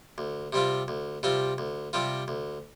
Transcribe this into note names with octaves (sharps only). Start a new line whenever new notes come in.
D2
C3 G3 C4 F4
D2
C3 G3 C4 F4
D2
C3 G3 C4 F4
D2